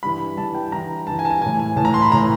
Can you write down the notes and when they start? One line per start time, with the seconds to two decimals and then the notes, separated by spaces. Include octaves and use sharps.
0.03 G2 E3 B5
0.37 G2 E3 A5
0.55 G5
0.72 G2 E3 A#5
1.07 G2 E3 A5
1.19 G#5
1.25 A5
1.30 G#5
1.42 A2 E3 G#5
1.59 G#5
1.76 A2 E3 A5
1.85 A#5
1.94 C6
2.02 B5
2.11 A2 E3 A#5